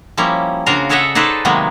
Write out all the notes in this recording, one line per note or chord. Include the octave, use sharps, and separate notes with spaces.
F3 G3 A#3 C#4 E4
C#3 D4 F4 F#4 A#4 F5
G#4 A4 C#5 D#5 E5 F#5
D#4 G#4 A4 B4 C5 D5
C3 D#3 F#3 G#3 A#3 B3